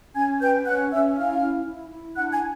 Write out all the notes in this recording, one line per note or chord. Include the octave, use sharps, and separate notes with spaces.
C#4 G#5 G#6
B4 G5 G6
C#4 F#5 F#6
C#4 E5 E6
E4 F5 F6
E4
E4
E4
D4 F#5 F#6
G#5 G#6